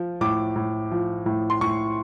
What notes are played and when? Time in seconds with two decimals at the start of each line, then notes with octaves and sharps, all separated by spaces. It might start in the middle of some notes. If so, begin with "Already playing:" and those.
Already playing: F3
0.21 A2 D6
0.56 A2
0.92 F3
1.26 A2
1.50 C6
1.61 A2 C#6